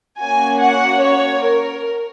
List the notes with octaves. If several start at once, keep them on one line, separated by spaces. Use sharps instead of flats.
A#3 C#4 F#4 G#5
F#5
C#5
A#4